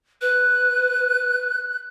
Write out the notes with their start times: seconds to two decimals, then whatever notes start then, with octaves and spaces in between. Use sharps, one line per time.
0.21 B4 F#6